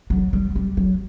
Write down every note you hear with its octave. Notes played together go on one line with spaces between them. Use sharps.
F#3
G3
G3
F#3